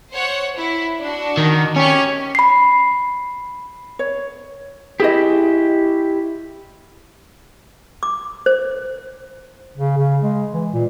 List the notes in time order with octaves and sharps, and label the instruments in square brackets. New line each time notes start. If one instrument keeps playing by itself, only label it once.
[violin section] C5 C#5 F#5
E4
D4 F#4
[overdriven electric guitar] D#3
[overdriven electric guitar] C#4 [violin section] G4 C#5
[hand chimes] B5 C7
[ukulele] C#5
[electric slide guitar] E4 G4 [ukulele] G#4 D#5
[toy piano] D6
C5
[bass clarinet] C#3
C#3
G#3
E3
A#2